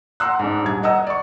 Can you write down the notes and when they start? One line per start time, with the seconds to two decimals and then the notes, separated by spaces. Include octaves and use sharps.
0.20 F#5 A#5 C6 E6 F#6
0.39 G#2 D4
0.64 D#1 G#6
0.83 D#5 F#5 A#5 E6
1.07 D5 C#6